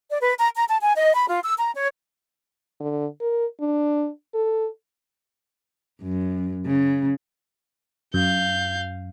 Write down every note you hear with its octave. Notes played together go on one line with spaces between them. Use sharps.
D5
B4
A#5
A#5
A5
G#5
D#5
B5
F4
E6
A#5
C#5
D3
A#4
D4
A4
F#2
C#3
F#2 F5 G6